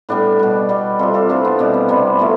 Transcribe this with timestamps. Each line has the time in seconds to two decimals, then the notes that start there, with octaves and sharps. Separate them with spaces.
0.09 A2 G3 B3 D4
0.39 B2 G3
0.69 B2 G3
0.99 C3 G3 F4 A4
1.14 F4 A4
1.29 C3 E3 A3 D4 F4
1.44 B3 D4
1.59 B2 G3 C4
1.74 B3
1.89 C3 G3 B3
2.19 C3 F3 A3